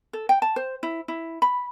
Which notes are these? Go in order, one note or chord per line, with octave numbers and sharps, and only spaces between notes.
A4
G5
A5
C5
E4
E4
B5